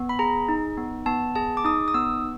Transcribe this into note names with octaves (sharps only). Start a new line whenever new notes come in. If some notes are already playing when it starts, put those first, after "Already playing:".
Already playing: B3
B5
G#4 A#5
D#4
B3
B3 A5
G#4 A5
D6
D#4 D#6
D#6
B3 E6